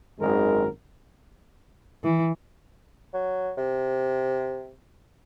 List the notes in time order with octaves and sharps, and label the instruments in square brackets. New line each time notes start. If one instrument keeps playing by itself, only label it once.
[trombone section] G#1 F#2 D#3 G#3 A#4
[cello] E3
[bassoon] F#3
C3